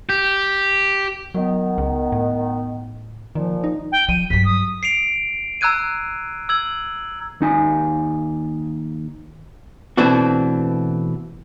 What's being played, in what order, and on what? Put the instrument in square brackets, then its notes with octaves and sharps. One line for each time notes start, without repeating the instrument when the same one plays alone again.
[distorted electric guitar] G4
[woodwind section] D#3 B3 [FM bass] F#3
[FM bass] C#2
A2
[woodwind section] A#2 F3 [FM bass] D#3
[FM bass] D#4
[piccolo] G5
[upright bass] F3 [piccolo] D#7
[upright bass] G2 F#3 [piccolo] B6
[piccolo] D#6
[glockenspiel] C7 D7 F7
A#5 E6 F#6 G#6 D#7
E6 G#6 F#7
[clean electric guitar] D#2 D#4 G#5
[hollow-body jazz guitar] B2 E3 A3 C4 D4 F#4